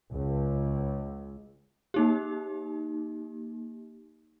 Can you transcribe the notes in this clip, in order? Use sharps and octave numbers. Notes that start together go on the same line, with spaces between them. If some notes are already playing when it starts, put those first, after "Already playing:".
C#2
A#3 D#4 G4